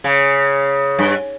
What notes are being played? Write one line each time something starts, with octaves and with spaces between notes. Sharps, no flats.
C#3
G2